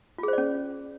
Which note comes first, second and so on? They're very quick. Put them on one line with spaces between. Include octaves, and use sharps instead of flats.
F4 G#4 C5 D5 C#4